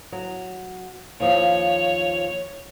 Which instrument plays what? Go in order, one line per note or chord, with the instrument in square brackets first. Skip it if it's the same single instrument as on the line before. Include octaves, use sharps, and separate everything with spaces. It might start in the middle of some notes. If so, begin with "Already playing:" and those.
[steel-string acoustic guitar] F#3
[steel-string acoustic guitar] D#2 F3 [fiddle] C#5